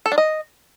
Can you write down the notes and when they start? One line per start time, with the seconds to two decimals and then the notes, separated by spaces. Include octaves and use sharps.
0.06 A4
0.12 D4
0.18 D#5